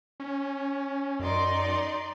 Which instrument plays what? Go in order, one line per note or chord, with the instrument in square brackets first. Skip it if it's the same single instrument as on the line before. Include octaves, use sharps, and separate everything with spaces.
[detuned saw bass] C#4
[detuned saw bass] F#2 [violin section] D#4 D5 C6